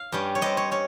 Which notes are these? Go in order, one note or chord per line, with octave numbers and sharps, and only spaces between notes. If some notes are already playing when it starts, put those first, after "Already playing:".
Already playing: F5
G2 G3 C#4
C#5
G2 G3 C4 D#5
C#5
C#4 C#5